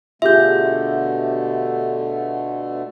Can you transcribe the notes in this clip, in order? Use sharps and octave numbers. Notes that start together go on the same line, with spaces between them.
B2 D3 A3 F4 G4 G#4 E5 G6